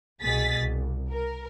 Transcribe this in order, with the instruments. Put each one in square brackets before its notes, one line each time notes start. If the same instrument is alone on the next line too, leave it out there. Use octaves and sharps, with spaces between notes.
[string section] C2 B2 G#4 A6 B6
C2
A#4